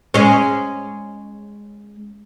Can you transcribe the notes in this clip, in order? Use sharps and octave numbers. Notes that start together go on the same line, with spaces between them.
G#3 C#4